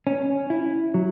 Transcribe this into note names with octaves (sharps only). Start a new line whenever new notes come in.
C#4
E4
F#3